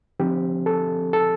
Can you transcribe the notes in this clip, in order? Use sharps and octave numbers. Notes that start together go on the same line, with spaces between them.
D3 F3 C4 G4
A4
A4